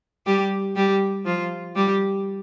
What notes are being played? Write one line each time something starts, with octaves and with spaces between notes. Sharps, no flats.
G3 G4
G3 G4
F3 F4
G3 G4